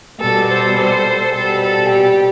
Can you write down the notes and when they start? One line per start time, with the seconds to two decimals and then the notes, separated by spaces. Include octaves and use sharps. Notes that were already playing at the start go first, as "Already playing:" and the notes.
0.20 B2 G3 A4
0.48 A4 C5
0.76 A4 C5
1.33 B2 G3 A4
1.61 A4
1.90 G4